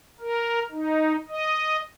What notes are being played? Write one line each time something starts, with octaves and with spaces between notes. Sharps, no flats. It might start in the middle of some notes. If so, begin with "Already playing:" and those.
A#4
D#4
D#5